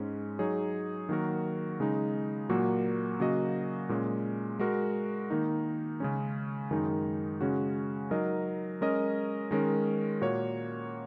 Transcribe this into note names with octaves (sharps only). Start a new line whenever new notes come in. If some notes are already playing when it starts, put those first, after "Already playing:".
Already playing: G#2 G#3 C#4
F#3 D#4 G#4 C#5
D#3 F#3 A#3 F#4 A#4
C#3 G#3 D#4
A#2 F#3 A#3 F#4
C#3 F#3 A#3 F#4 D#5
A#2 G#3 C#4
G#3 F#4 A#4
D#3 A#3 D#4
C#3 G#3 C#4
F#2 D#3 G#3 D#4
C#3 G#3 C#4 F#4
F#3 D#4 A#4 D#5
G#3 C#4 A#4 D#5
D#3 G#3 C#4 A#4
A#2 A#3 F#4 C#5